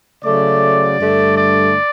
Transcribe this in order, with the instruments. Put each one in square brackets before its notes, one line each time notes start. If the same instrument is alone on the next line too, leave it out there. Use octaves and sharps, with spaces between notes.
[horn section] C#3 F#3 A3 D5
G2 D3 A3
D5